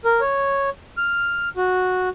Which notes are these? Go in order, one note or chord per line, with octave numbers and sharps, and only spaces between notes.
A#4
C#5
F6
F#4